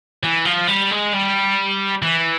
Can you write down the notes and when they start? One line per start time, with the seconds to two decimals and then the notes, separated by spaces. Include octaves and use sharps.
0.23 E3
0.45 F3
0.67 G3
0.91 G#3
1.13 G3
2.02 E3